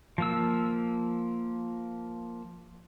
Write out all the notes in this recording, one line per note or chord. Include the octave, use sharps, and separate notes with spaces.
F3 A#3 E6